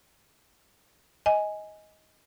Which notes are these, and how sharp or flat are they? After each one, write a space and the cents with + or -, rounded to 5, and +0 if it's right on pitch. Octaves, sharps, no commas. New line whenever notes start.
D#5 +15 G#5 +0